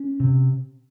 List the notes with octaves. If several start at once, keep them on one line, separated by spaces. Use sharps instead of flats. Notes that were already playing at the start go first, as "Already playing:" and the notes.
Already playing: C#4
C3